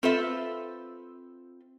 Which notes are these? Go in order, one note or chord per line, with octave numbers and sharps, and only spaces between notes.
C4 F4 A4 B4 C5 E5